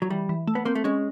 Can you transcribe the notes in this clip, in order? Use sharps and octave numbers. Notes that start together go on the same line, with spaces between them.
F#3
E3 G3
E3
A3
B3
A#3 C4
A3
G#3 C#4